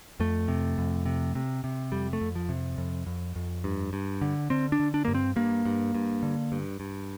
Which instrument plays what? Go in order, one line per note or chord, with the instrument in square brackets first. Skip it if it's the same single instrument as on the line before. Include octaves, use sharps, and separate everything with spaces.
[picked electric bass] F2 A3
C3
F2
C3
C3
C3
F2 G3
A3
F2
F3
C3
F2
F2
F2
G2
G2
D3
D3 C4
D4
D3
D4
G2 A#3
C4
G2 A#3
G2
G2
D3
G2
G2